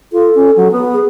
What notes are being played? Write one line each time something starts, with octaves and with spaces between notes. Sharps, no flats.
F4 A4
C#4
F#3
B3
G#4